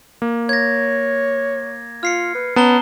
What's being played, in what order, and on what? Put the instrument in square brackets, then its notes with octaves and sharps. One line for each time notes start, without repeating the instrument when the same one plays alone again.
[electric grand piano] A#3
[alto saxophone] C#5 [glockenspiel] G#6 A#6
[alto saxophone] F4 [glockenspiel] F6 C7 C#7
[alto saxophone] B4
[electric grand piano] B3 [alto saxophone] C#4 [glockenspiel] A5 A#5 G7